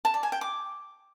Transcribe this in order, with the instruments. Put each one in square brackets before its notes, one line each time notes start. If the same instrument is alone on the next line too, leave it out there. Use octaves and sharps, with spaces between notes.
[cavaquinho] A5
D5
G#5
G5
D6